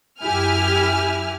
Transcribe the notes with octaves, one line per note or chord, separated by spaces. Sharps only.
F#2 E4 G4 G#5 F6